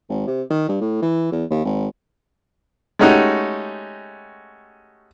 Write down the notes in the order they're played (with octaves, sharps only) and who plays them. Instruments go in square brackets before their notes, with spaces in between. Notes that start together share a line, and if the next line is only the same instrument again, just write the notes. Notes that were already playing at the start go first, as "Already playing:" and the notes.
[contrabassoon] G#1
C3
D#3
G2
A2
E3
E2
D#2
G#1
[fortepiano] G#3 A3 C#4 D#4 F#4 G4